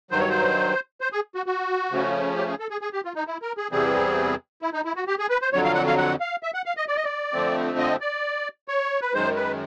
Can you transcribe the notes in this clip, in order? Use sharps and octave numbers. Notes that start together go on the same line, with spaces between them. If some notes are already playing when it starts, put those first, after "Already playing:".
G2 D#3 F#3 C5
C#5
C5
C5
G#4
F#4
F#4
C#3 F3 A3 C#4
G4
G#4
A4
G#4
G#4
G4
F4
D#4
E4
A#4
G#4
E2 C3 E3 G3 C4 G#4
E4
D#4
E4
F#4
G4
G#4
B4
C5
F2 D3 F#3 C#5
F5
F#5
F5
F#5
F5
E5
F#5
F5
D#5
D5
D#5
D5
F2 D3 F3 A3 C4
D#5
D5
C#5
B4
F#2 D#3 G#3 C5
B4